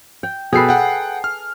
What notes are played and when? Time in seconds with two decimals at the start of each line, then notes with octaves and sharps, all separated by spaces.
0.23 G5
0.53 B2 G#4 A4 B4 G5 C7
0.69 F#5 G5
1.24 F6